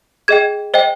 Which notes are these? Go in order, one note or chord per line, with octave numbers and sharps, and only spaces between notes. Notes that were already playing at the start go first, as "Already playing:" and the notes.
G#4 D#5 G5 G#6
C5 D#5 G5